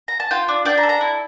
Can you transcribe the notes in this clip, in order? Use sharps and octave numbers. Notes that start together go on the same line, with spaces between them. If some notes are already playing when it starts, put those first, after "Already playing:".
A#5
A5
F4 G5
D4
D4 G5
A#5
A4
A#5
E4